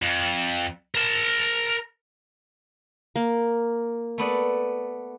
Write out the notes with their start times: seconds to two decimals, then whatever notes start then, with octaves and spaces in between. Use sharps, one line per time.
0.02 F2
0.95 A#4 A5
3.16 A#3
4.18 A3 B3 D5